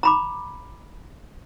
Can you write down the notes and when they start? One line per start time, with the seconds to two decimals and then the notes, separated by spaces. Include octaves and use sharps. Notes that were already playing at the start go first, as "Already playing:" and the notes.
0.03 A#5 B5 D6